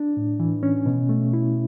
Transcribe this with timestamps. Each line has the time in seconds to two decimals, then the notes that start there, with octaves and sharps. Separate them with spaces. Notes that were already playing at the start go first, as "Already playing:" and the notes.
Already playing: D4
0.17 A2
0.40 E3
0.63 C#4
0.86 B2
1.09 A3
1.33 E4